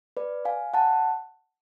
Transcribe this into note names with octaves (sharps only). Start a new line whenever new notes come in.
B4 D5
F5 G#5
F#5 A5